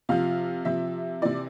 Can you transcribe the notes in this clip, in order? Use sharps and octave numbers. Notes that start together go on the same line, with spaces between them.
C3 F3 F5
C3 F3 E5
C3 E3 D5